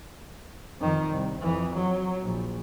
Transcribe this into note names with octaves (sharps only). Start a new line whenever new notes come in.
F2 D#3
C2
F2 E3
F#3
A#1